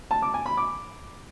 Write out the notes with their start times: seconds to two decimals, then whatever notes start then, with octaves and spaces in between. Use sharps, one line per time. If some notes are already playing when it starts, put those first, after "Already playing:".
0.11 A5
0.22 D6
0.34 G#5
0.46 B5
0.57 D6